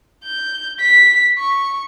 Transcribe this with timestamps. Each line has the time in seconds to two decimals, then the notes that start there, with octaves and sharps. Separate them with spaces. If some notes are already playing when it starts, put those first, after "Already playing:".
0.24 G6
0.80 B6
1.39 C#6